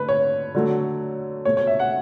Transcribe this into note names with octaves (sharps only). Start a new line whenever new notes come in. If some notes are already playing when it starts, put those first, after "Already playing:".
Already playing: D3 A3 B4
C#5
D3 F#3 A3
B2 A3 C#5
C#5
E5
F#5